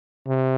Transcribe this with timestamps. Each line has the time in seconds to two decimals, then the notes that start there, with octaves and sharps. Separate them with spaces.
0.27 C3